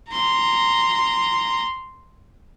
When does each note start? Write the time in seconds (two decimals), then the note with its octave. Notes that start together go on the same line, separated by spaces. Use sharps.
0.10 A#5 C6